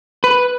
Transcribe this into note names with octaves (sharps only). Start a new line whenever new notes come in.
B4